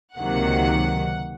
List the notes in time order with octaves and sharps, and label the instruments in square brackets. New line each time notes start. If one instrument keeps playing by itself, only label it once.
[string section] C#2 C3 D#3 F#3 A#3 F#5